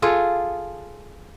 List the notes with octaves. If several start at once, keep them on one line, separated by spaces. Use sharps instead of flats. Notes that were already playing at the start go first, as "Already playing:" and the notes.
F4 G#4 A4